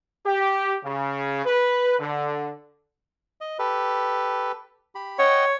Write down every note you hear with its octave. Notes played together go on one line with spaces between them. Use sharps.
G4
C#3
B4
D3
D#5
G4 A4 B4
G4 B5
C#5 D#5 F#5 G5